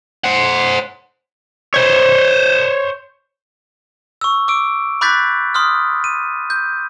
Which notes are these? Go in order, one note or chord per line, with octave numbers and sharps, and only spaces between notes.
C5 F#5
C5 C#5
C#6 E6
D6 E6 D7
B5 D6 F#6 G6 A6 B6
C6 D#6 F6
D#7
G6